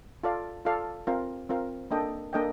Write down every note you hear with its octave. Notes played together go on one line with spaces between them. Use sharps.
F4 A4 D5 F5
F4 A4 D5 F5
C4 F4 A#4 F5
C4 F4 A#4 F5
A#3 D4 A4 D#5 G5
A#3 D4 A4 D#5 G5